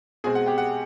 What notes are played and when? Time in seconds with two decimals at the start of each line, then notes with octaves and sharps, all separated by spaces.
0.24 B2 G#3 C4 G#4 G#5
0.35 F#5
0.46 G4 G5
0.58 F#5